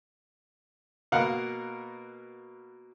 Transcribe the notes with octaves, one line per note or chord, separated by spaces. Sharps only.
B2 A#3 A#4 F5 F#5 F#6